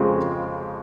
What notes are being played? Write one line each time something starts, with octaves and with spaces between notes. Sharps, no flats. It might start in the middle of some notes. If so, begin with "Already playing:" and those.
Already playing: F2 C#3 F3 G#3 C4